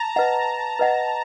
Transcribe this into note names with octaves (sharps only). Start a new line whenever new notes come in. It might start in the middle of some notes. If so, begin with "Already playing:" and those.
Already playing: A5 A#5
B4 D#5 F#5 A#5
B4 D#5 F#5